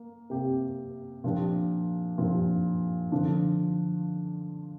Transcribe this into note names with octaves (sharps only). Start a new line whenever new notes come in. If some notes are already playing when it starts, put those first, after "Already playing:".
Already playing: A#3
C3 A#3 G4
A#2 F3 D4 G4
A#2 F3 D4 G4
D3 F3 D4 F4